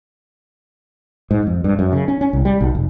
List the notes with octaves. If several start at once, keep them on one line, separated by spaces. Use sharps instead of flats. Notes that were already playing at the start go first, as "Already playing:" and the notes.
G#2
F2
G2
F#2
C#3
C#4
C#4
C2
G3
B1
F1